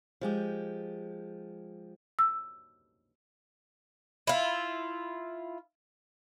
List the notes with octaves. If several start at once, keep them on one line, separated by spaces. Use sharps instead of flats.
F3 G#3 G4
E6
E4 F4